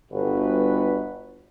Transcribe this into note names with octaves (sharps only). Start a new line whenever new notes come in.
G1 F#4 B4